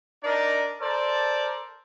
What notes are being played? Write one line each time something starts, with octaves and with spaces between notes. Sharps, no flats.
D4 D#4 A#4 D5
A4 A#4 C5 D5